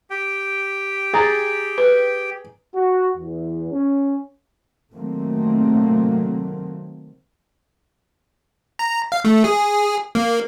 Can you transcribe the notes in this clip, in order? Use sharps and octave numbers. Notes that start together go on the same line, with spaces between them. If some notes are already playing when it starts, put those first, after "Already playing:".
G4 G5
G#4 A#5 A6
B4
F#4
E2
C#4
C3 D#3 F#3 A3 A#3 C4
A#5
F5
A3
G#4
A#3